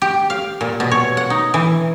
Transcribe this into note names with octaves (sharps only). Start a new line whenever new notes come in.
G4
F5
A#2
B2
C#5
F#5
D#4
E3